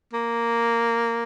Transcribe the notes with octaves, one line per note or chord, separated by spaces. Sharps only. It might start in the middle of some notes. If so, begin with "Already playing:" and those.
A#3